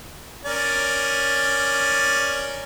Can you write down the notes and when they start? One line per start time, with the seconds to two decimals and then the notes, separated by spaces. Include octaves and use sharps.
0.45 C#4 A#4 D5